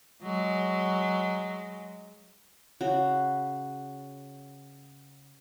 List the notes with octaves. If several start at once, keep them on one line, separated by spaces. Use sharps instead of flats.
F#3 G#3
C#3 F#4